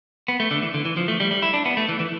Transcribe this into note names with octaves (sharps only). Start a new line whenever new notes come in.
B3
A3
D3
E3
D3
E3
F3
A3
G3
G3
E4
D4
B3
A3
E3
E3